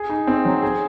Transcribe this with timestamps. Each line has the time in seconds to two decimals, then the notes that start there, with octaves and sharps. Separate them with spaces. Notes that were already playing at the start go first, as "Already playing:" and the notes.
Already playing: G#4
0.10 D#4
0.27 C4
0.45 F#3
0.62 G#4